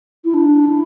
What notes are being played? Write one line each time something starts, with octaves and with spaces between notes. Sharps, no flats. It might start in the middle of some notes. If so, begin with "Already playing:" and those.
E4
D4
E4